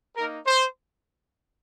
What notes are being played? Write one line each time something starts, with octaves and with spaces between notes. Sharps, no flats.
A#3 D#4 A#4
C5